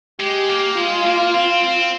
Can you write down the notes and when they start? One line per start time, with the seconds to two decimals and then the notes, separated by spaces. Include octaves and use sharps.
0.20 G#3 G4
0.49 A#3
0.77 G#3 F4
1.06 A#3
1.34 C4
1.64 C4